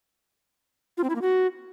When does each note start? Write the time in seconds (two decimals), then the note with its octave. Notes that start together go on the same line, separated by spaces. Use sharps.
0.97 F4
1.04 C4
1.10 E4
1.16 A#3
1.22 F#4